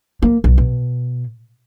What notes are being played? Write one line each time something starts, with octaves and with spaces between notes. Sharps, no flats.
A#3
B1
B2